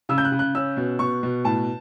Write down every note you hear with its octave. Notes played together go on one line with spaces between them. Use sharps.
C#3 E6
G6
F#6
C#3
F#6
C#4 E6
B2
B2 C#6
B2
A2 A5